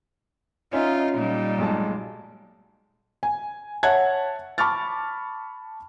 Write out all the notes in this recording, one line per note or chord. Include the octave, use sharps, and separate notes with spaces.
C#4 D#4 F4 E5
A#2 G3 D#4
B1 G#3 A5
G#5
C#5 E5 F#5 A5 F#6 G#6
A5 B5 C#6 D6 F6 A6